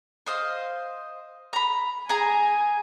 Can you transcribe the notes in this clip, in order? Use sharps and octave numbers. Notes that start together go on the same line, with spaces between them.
C5 D#5 F5
A#5 B5
G#4 G#5 A#5